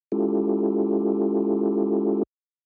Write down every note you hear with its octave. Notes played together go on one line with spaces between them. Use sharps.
G#3 C#4 E4 F4 G4 A4